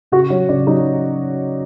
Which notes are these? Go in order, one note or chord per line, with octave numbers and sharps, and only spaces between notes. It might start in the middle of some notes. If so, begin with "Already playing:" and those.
C#3 F#4 F#5
F#3 C#5
C#3 D5
F#3 D#4 D#5